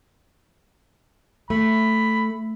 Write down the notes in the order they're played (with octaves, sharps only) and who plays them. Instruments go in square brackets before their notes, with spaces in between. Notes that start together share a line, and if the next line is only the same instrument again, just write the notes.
[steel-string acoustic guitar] A3 [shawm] B5